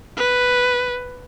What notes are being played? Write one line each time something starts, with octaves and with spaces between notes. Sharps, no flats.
B4